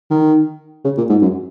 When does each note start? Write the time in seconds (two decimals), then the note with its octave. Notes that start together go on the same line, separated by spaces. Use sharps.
0.11 D#3
0.85 C#3
0.98 A#2
1.10 G#2
1.22 F#2